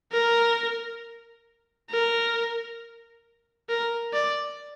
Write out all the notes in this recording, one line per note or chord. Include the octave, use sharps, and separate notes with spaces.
A#4
A#4
A#4
D5